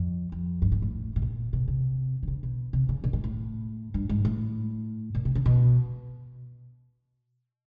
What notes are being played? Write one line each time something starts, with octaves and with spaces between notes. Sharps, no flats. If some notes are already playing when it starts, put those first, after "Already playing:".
Already playing: F2
F2
G2
G#2
A2
A2
A#2
B2
C3
D3
C#3
B2
C3
C#3
A#2
A2
A2
G2
G#2
A2
A#2
C3
C#3
B2